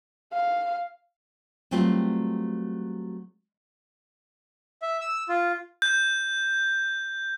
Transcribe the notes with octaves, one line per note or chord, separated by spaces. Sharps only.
F5
F#3 G3 A3 C4 F4 B4
E5
E6
F4
G6